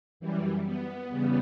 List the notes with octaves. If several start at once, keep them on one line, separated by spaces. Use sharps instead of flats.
F#2 E3 G3
B3
E2 C#3 G3 B3